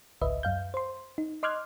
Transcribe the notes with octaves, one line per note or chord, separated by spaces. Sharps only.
G#1 C#2 B4 D#5 E5
F#2 F5 G6
C5 C6
D#4
D#5 C6 D6 F6 F#6 G#6